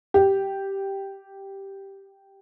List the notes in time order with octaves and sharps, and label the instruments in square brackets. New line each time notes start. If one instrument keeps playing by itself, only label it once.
[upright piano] G4